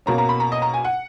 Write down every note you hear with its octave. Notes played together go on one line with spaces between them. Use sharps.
B2 A#3 C#4 A#5
A#5
B5
A#5
D#5
A#5
G#5
F#5